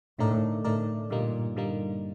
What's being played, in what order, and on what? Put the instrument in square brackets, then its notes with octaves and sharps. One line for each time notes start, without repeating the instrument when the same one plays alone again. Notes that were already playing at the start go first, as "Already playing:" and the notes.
[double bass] A2 [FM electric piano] D3 A3 D#4 A#4 D5
[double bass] A2 [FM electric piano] D3 A3 D#4 A#4 D5
[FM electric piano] G2 D3 G3 A#3 D#4 [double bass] A#2
[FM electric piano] G2 D3 G3 A#3 D#4